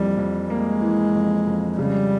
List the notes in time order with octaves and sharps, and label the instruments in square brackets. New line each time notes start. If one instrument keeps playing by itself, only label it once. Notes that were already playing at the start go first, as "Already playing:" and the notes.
Already playing: [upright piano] F2 E3 A#3 [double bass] G3
[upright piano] F2
[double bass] G#3 [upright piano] A#3
[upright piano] E3
F2
F2
[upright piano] C#3 [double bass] G3